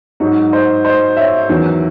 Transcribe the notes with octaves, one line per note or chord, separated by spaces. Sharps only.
G#2 F#3 D#4 F#4
C5 D#5
C5 D#5
C#5 E5
E2 D#3 F#3